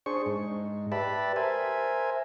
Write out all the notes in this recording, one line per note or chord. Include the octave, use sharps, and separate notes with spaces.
D4 G#4 C5 C#6
G#2
G4 B4 D5 E5 A5 B5
A#4 C5 E5 G#5